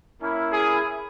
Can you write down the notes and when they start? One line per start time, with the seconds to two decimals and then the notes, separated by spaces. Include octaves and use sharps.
0.21 A#3 C#4 E4
0.52 G#4